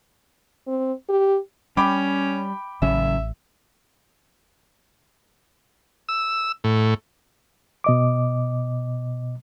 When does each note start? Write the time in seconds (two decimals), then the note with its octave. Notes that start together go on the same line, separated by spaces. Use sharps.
0.67 C4
1.09 G4
1.77 G3 C#4 G5 B5 D6
2.82 A1 C#3 F#3 C#4 E5
6.09 E6
6.64 A2
7.84 B2 D#5 D6